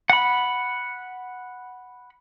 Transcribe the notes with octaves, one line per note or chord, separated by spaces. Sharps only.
F#5 B5